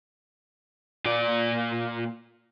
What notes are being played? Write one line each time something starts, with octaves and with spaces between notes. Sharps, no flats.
A#2 D5